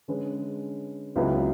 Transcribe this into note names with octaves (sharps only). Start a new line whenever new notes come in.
D3 G#3 C#4 G#4 B4
C#2 C#3 F#3 B3 E4